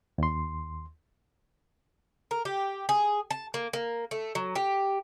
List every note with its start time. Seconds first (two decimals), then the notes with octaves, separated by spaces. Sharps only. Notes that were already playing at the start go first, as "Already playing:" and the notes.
0.18 D#2 C6
2.31 A#4
2.45 G4
2.89 G#4
3.31 A5
3.54 A#3
3.73 A#3
4.11 A3
4.35 F#3
4.56 G4